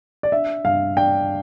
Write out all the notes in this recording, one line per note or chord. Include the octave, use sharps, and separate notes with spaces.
D5
D4 E5
G2 F5
D4 G5